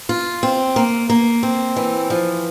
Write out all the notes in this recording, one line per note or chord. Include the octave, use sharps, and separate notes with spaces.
F4
C4
A#3
A#3
C4
E3
F3